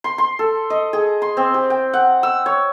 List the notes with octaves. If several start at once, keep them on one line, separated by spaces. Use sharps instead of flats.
C6
C6
A4
D#5
G#4
C6
C4
G4
G5
F#5
E6
C#5